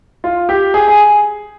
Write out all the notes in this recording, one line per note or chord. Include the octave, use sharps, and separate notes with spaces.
F4
G4
G#4
G#4